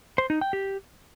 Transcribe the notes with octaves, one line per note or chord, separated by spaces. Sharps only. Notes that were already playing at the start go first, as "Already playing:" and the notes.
C5
D#4
G5
G4